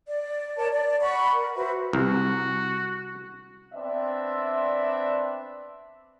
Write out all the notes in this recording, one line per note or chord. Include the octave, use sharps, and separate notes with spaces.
D5
A#4 C#5 D5 A5
D5
F#5 B5 C#6
A#4
F#4 B4 C5 E5
C2 F#4
B3 C4 D4 D5 E5